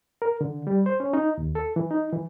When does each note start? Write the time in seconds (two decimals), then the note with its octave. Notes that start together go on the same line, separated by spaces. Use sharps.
0.22 A#4
0.41 D3
0.67 G3
0.86 C5
1.00 C#4
1.13 D#4
1.38 D#2
1.55 A4
1.76 E3
1.91 D#4
2.13 E3